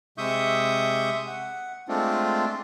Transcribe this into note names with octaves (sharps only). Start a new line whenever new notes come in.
C3 G#3 E5 C#6 D#6 G6
F#5
G#3 A3 C4 D4 F4